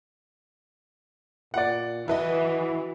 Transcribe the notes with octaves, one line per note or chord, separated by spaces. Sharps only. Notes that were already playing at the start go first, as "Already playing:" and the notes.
A#2 D5 F#5
E3 E4 F#4 B4 D#5